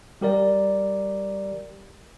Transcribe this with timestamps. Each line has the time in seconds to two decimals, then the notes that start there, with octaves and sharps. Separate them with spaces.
0.21 G3 G4 A#4 D5